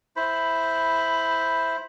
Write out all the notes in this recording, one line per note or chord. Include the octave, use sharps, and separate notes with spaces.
E4 C5 B5